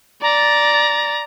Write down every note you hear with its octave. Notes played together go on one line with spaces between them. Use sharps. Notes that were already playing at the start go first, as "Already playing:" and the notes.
D5 A#5 A6